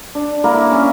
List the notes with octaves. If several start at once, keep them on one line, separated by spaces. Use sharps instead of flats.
D4
A#3 E4 A#4
C#4 E5